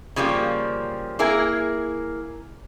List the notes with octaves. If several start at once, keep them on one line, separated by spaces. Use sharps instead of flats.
C#3 F3 G3 A#3
A#3 E4 G#4 A#4